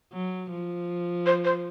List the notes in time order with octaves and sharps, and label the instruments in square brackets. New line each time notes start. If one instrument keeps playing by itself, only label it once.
[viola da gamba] F#3
F3
[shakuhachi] C5
C5